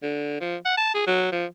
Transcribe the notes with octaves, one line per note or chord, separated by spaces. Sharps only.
D3
F3
F#5
A5
G#4
F#3
F3